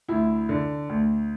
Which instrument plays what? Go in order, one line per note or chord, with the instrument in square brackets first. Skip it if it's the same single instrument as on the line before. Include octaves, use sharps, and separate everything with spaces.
[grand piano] D2 E4
D3
D2